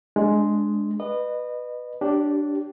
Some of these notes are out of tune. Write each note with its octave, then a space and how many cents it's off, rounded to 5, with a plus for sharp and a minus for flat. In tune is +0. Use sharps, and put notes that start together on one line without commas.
G#3 +10 D4 +0
B4 +0 D#5 -30
D4 +0 G4 -20 C#5 +20